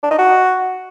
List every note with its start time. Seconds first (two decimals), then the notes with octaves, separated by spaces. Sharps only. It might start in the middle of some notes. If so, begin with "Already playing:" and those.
0.03 D4
0.11 D#4
0.19 F#4